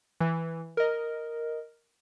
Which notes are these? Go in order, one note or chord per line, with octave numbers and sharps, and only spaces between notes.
E3
A#4 D#5